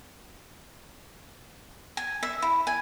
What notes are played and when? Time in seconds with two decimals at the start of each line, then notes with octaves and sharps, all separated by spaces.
1.97 G#5
2.23 E5
2.42 E4
2.67 G#5